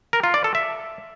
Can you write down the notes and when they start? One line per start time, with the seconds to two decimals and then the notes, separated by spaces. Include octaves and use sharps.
0.13 A#4
0.24 F4
0.34 D5
0.44 A4
0.55 E5